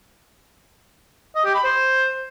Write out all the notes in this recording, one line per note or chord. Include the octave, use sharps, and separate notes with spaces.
D#5
G4
B5
C5